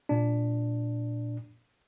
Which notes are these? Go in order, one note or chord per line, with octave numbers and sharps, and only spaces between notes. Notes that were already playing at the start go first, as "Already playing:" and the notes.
A#2 D4